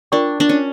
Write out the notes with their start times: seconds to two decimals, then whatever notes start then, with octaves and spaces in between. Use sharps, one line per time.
0.12 D4 F4 A#4 D5 G5 C#6
0.40 D4
0.49 C#4